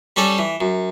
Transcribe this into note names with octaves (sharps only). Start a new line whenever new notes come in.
G3 C#4 A4 D5
E3
F#2